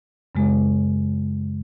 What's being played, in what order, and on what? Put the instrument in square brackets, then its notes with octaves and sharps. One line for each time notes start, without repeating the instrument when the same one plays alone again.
[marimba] F#2 C#3 G#3